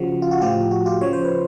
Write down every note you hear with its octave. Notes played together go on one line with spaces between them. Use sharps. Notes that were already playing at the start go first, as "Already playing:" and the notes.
Already playing: C#3 F3 F#4
F4
F#4
A2 F3 F4 G4
F#4
F4 G4
C#3 F3 C#5
C5
B4